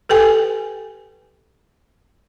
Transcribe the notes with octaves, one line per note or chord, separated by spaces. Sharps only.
G4 A4 B4 G5 G#5